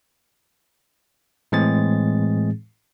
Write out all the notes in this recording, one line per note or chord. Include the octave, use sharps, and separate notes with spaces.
A2 E3 G#3 C4 G#4 A6